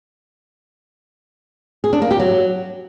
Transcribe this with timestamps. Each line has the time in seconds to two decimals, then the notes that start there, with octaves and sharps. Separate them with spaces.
1.84 G#4
1.93 D4
2.02 A#3
2.11 G4
2.20 F#3